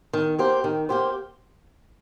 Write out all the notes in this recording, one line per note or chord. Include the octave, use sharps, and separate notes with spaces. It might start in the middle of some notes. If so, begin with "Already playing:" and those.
D#3
A#3 G4 C5
D#3
A#3 G4 C5